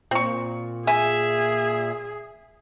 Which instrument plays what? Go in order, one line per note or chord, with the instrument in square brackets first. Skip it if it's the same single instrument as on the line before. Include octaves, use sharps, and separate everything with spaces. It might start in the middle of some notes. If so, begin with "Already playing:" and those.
[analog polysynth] A#2 [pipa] C4 C#6
[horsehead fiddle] G#4 [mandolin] E5 [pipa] G#5